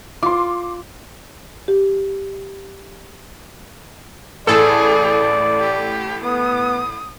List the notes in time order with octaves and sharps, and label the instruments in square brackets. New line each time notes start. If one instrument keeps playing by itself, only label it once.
[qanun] F4 [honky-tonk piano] C6 D6
[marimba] G4
[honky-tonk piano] A1 A2 [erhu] G#4 [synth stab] A4 [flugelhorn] D5
[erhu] G4
[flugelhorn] B3 [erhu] D#6